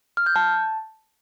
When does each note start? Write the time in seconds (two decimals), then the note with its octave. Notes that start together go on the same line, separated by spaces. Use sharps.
0.17 F6
0.26 G6
0.36 A5